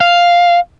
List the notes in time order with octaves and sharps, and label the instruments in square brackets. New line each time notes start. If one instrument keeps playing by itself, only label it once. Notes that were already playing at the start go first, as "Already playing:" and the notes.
[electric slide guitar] F5